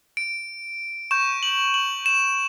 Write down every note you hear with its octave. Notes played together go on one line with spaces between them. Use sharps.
D7
C#6 G6 E7
F#7
F#7
E7